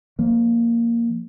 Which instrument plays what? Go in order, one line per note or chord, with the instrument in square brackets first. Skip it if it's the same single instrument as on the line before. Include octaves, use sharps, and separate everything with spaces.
[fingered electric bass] F3 A#3